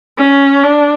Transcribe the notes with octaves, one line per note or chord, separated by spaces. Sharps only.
C#4
D4